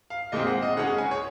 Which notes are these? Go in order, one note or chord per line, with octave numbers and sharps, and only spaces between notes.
F5
A#2 G#3 C4 D#5
F#5
D#5
C#3 G#3 C#4 F#5
G#5
C#5